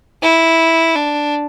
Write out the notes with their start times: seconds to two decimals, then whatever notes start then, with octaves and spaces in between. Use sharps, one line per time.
0.22 E4
0.95 D4